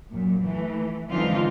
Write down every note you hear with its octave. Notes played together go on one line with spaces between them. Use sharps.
F#2 A#2
E3 A3
D3 E3 G#3 C4 D#4 F4